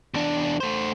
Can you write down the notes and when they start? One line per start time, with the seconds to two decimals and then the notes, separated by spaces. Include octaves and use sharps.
0.14 E2 D4
0.60 A3 C5